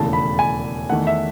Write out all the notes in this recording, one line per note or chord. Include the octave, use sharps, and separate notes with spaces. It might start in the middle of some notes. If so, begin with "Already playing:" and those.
Already playing: E1 D#2 C#3 E3 A3 A5
B5
G#5
E2 D#3 A3 F#5
E5